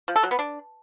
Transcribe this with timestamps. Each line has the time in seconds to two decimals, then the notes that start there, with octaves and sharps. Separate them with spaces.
0.08 F3
0.16 A4
0.23 F#3
0.31 B3
0.39 D4